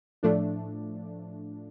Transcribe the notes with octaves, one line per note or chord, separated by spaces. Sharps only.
A2 F3 A3 D4